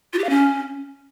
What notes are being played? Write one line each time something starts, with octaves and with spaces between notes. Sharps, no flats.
F4
G4
F5
C#4